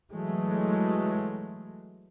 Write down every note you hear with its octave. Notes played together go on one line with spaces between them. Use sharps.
E3 F#3 G#3 A3